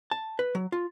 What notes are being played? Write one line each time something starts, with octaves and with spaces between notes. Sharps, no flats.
A5
B4
F#3
F4